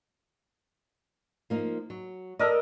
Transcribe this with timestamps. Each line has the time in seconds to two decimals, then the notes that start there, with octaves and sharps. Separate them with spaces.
1.50 F3 A#3 D#4
1.90 F#3
2.39 A4 A#4 D5 D#5